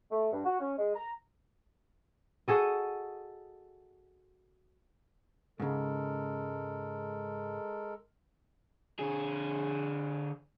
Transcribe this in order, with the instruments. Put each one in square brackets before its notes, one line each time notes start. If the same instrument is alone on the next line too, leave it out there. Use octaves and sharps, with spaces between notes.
[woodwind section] A3
G2
F#4
C#4
G#3
A#5
[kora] F#4 G#4 A4 D#5
[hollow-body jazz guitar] G#2 C#3 [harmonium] G#3 A4 A#4
[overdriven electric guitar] D3 G#4